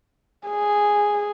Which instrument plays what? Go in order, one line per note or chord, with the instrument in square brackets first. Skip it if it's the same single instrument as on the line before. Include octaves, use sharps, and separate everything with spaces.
[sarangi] G#4